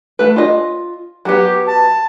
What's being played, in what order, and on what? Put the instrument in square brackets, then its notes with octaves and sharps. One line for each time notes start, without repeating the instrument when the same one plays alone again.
[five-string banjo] A3 B4
F4 D#5
[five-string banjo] F#3 B3 [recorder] G4
[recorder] A5